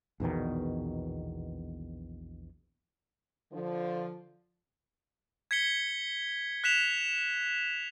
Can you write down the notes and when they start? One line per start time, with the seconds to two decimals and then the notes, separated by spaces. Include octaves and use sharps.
0.20 A#1 E2 B2 D#3
3.52 D3 F3
5.51 G#6 B6 C#7 G7
6.64 F#6 B6 E7 F7